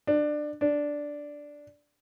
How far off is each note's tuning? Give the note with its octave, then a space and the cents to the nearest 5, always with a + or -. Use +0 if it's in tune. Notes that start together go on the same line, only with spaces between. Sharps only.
D4 +20
D4 -5